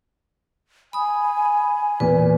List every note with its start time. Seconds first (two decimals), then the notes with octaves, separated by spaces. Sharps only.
0.93 G#5 B5 D#6
2.00 E2 A#2 B4